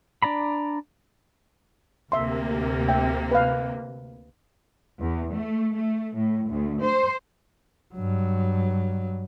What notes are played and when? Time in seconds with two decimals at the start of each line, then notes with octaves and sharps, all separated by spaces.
0.22 D4 D5 A#5 B5
2.12 D2 C3 A#3 E5 C6
2.89 E5 G5
3.31 B4 F5
5.01 E2
5.35 A3
5.75 A3
6.16 A2
6.51 D2
6.84 C5
7.95 G2 F#3